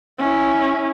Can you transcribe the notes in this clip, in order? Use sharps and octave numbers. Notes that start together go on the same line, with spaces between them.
C#4 E4